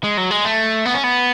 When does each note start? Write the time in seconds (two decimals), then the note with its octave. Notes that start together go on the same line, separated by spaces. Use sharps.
0.04 G#3
0.17 F#3
0.31 G#3
0.45 A3
0.85 B3
0.94 C#4
1.04 B3